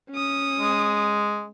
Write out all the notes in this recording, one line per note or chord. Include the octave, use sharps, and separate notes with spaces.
C#4 D#6
G#3